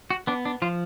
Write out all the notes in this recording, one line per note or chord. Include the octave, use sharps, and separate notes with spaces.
F#4
B3 D4
D4
F3 F4